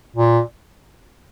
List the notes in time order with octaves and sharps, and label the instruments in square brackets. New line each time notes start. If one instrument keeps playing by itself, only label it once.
[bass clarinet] A#2